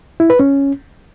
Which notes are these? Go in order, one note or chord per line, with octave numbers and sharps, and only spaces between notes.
E4
B4
C#4